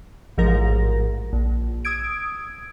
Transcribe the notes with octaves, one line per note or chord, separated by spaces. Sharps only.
A1 G#2 F3 A#4 A#6
A#1
D#6 E6 G#6 D7